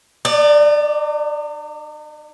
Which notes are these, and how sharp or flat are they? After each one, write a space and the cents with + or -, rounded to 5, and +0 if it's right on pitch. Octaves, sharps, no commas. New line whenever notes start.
D#4 -45 D5 +5